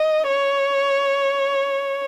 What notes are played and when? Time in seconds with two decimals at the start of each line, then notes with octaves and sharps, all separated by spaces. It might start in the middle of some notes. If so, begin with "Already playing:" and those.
Already playing: D#5
0.29 C#5